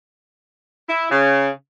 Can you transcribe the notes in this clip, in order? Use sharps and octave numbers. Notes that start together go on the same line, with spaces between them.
E4
C#3